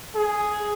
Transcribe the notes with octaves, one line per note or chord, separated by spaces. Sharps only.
G#4